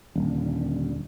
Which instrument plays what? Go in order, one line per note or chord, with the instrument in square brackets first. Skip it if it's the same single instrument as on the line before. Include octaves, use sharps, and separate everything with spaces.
[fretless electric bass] D#1 [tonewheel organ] D#2 D3